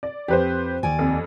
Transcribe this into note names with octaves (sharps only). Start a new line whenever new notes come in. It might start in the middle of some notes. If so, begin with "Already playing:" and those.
D5
F2 G4 B4 C5
D#2 D5 G#5
F2